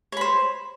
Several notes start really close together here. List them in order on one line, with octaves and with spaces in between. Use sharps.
C#5 B5 C5